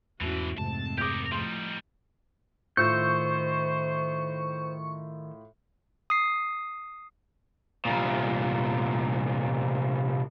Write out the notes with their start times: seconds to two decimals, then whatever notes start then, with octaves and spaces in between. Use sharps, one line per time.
0.21 E2 G#2 B2 E3 A3 C#4 E4 F#4
0.58 F2 G#2 C3 G#3 A3 C4 A5
0.98 G4 A#4 D6 D#6 G6
1.32 A2 F3 G3 D#4 C6
2.77 A2 D#3 F4 C5 C#6 E6 G6
6.10 D#6 C7
7.85 C2 A#2